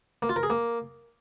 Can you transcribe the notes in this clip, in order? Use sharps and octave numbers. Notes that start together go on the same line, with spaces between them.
A#3
F4
A#4
G#4
A#3